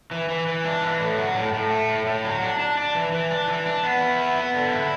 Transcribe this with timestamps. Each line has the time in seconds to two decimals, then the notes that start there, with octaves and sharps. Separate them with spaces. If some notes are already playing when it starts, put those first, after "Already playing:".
0.11 E3
0.29 E3
0.47 E3
0.65 D4
0.82 E3
1.00 A2
1.18 F#3
1.35 A2
1.53 A2
1.71 A3
1.89 A2
2.06 A2
2.24 F#3
2.42 D4
2.60 D4
2.77 D4
2.95 E3
3.12 E3
3.31 D4
3.48 E3
3.66 D4
3.83 B3
4.01 E4
4.18 B3
4.36 B3
4.54 D3
4.72 E4